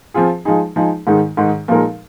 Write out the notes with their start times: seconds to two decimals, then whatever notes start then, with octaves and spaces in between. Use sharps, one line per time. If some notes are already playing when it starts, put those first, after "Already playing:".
0.14 F3 C4 F4 G#4
0.45 F3 G#3 D#4 G#4
0.76 F3 G#3 D#4 G#4
1.07 G#2 D#3 G#3 D#4
1.37 G#2 D#3 G#3 D#4
1.68 A#2 F3 G#3 D#4 A#4